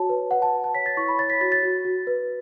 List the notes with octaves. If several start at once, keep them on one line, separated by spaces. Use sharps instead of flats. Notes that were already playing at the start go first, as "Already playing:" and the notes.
Already playing: F#4 C#5 A5
B4
B4 F#5
A5
B4
A5
C#5 B6
A6
E4 C#6
B5
C#5 A6
B6
F#4 A6
A6
F#4
F#4
B4